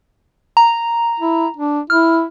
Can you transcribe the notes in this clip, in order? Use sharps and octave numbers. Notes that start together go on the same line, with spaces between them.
A#5
E4
D4
E4 F6